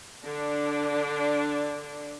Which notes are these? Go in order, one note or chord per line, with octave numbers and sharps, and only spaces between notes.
D3 D4